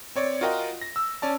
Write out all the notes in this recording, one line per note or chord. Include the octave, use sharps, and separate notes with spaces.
C4 C#5 D5
F4 F#4 A#4 D#5 G5
A#6
E6
C#4 D5 A5